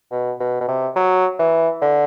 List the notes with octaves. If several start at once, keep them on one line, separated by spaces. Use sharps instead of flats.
B2
B2
B2
C3
F#3
E3
D3